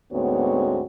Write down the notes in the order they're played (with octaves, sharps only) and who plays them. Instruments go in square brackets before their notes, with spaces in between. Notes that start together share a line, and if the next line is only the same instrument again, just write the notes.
[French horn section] D2 G#2 B3 C4 F#4 C#5